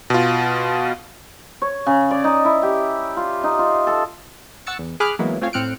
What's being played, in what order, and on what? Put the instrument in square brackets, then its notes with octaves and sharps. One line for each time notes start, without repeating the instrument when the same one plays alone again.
[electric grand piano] B2 F4
[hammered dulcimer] C#5
C#3
D5
D#4
E4
G4
F4
D#4
F4
A4
[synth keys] F#5 C#6 E6 A6 C#7
E2
G#4 B5 D6 F6 F#6
E3 F#3 G#3 A#3 B3 E4
A3 C4 C#4 F4 C#5 F5
A2 C4 F6 F#6 C#7 D7